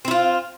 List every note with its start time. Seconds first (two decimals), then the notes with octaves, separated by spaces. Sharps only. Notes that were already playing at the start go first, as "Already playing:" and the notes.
0.05 C4
0.08 E4
0.11 F4